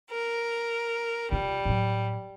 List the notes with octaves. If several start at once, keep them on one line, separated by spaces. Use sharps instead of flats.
A#4
C3 G3 F4
A2 F#3